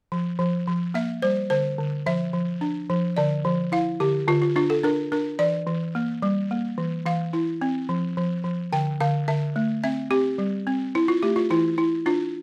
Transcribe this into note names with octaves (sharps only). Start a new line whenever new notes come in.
F3
F3
F3
A#3 E5
G3 C5
D3 C5
D3
F3 E5
F3
D4
F3
D3 D5
F3
E4 F5
D3 G4
D3 F4
F4
D4 F4
A4
D4 A#4
D4 A#4
E3 D5
E3
A#3
G3
A#3
E3
E3 F5
E4
C4
F3
F3
F3
D3 G5
D3 F5
D3 E5
A3
C4 E5
C4 G4
G3
C4
E4
F4
A3 G4
F4
E3 E4
E4
D4 F4